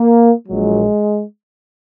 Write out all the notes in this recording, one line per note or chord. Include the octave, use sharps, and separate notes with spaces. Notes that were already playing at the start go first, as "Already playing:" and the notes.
Already playing: A#3
A#1 A#2 F#3 G#3